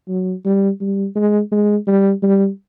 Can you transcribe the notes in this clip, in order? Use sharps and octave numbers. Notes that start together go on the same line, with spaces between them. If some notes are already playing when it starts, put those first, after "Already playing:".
F#3
G3
G3
G#3
G#3
G3
G3